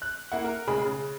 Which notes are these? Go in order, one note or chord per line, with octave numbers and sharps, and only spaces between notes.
F#6
A#3 E4 F#5
A#4
F1 C#3 G#3 G#4 B5
C#3